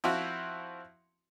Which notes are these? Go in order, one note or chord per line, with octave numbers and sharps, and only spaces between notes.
F3 C4 E4 F#4